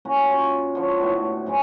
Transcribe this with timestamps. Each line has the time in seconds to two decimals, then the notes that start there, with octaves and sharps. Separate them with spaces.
0.05 A#3 C#4 F#4 A#4
0.30 F4 C#5
0.75 D3 F3 C#5
1.00 A2 B3 F#4
1.46 G#2 F#3 G#3 D6